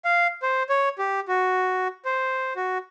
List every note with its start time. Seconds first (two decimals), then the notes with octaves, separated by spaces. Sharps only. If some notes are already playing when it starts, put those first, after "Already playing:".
0.05 F5
0.42 C5
0.69 C#5
0.99 G4
1.28 F#4
2.05 C5
2.56 F#4